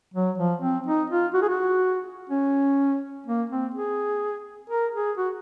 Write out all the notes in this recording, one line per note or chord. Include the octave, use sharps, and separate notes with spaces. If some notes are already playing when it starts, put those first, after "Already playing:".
F#3
F3
C4
D#4
F4
F#4
G#4
F#4
C#4
A#3
C4
G#4
A#4
G#4
F#4